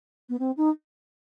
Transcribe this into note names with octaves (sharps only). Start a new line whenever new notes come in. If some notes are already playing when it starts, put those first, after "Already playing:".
B3
C4
D#4